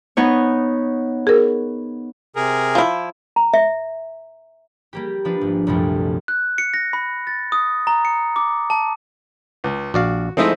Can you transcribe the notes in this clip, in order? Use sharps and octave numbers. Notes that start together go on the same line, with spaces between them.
B3 D#4 C#5
G#4 A#4
C3 G#4 A#4
F3 E4
A#5
E5
G3 A#3 G4
F3 D4 B4
G#1
C2 F#2 A#2 F3 G3 A3
F#6
C#7
A#6
B5
A6
D#6
A#5
C#7
D6
A5
C#2
A#1 F#4 D5 F5
F3 G#3 A3 C4 D#4 E4